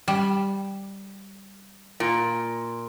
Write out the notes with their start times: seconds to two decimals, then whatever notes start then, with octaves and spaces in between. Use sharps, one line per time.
0.08 G3
2.00 A#2